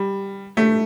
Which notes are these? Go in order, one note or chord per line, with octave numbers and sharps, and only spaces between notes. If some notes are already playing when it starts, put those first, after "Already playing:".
Already playing: G3
A3